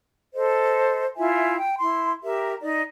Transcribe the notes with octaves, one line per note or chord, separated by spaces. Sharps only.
A4 C5 D#5
E4 F4 E5 G#5
G5
E4 C6
G4 A#4 E5
D#4 D5